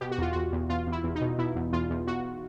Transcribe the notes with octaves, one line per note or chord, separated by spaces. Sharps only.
B2 G4
F#4
E2 F4
E2 F#4
E2
E2 F4
E2
E4
E2
D#4
B2
B2 E4
E2
E2 F4
E2
E2 F#4